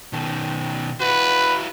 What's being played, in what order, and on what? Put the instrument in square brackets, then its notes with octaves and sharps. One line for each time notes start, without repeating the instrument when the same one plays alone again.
[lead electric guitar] B2 D#3
[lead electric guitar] E4 F#4 [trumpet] B4